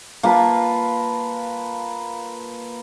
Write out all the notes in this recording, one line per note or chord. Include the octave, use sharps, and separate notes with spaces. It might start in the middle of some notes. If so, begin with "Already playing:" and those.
A#3 F4 B4 A5